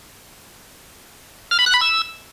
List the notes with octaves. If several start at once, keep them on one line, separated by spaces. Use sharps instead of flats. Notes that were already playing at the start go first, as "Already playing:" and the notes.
F6
B5
F#6
B5
E6